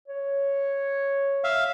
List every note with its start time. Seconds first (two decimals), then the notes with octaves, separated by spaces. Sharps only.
0.08 C#5
1.44 E5 F5